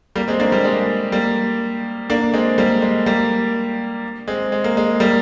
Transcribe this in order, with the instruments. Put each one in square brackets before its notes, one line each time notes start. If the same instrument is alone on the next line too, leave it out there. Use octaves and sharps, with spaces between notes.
[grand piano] G3 A#3
G#3 C4
A#3 D4
G3 A#3
G#3
G3 A#3
A#3 D4
G#3 C4
G3 A#3
G#3
G3 A#3
G#3 C4
G#3
A#3
G#3
G3 A#3